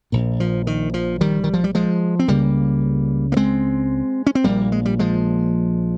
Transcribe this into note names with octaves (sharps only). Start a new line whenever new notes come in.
A#1 A#2
F3
D#3
F3
D#3 G3
D#3
F3
G3
F3 G#3
C4
C#2 C#3 G3 A#3
A#3
G#3 C4
C#4
C4
A#1 A#2 G3 A#3
G#3
G3
F3 G#3